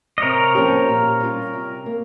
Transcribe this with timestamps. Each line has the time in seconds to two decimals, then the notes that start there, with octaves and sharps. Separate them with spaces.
0.18 D#5
0.22 C3 A#4 C#5
0.55 F3 A#3 C#4 G4
0.88 A#2
1.20 G3 C#4 F4
1.53 C3
1.86 A#3